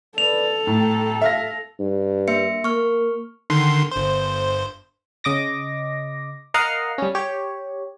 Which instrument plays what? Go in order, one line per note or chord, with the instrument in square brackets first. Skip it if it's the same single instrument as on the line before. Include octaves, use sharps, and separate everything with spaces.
[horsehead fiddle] A4 [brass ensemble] B4 D5 [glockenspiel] F7
[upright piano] A2 [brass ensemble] G5 A#5
[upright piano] E5 F5 A#6
[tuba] G2
[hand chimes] A#3 E5 C#7
[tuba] A#3 [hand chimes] C#6 F6
[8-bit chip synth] D3 D#3 C6
G1 C5
[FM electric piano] C#3 D#5 D6 A#6
A#4 D#5 F5 F#5 A#5 F6
G3 C#4
G4 C#5